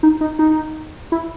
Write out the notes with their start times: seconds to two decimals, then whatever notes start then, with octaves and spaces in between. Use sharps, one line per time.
0.03 D#4
0.21 D#4
0.39 D#4
1.12 E4